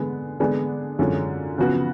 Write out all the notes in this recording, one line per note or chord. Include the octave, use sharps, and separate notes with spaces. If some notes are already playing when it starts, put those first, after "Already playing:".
Already playing: D3 G#3 B3
D3 G#3 B3 D4 G#4
F#2 D3 G#3 C#4 F4
C#3 F3 B3 F#4